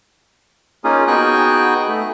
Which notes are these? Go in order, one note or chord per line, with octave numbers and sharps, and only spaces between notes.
A#3 C#4 D#4 F4 G#4
B3 D#4 F#4 G#4 G5 F#6
A3